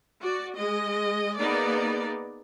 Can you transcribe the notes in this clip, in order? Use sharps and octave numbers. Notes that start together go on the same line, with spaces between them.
F#4 D5
G#3 D#5
A#3 B3 D#4 G#4 D5